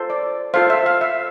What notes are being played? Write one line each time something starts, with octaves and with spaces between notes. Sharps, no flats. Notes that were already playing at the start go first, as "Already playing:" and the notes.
Already playing: F4 A4 C5
D5
F4 A4 C5 F5
E5
F5
E5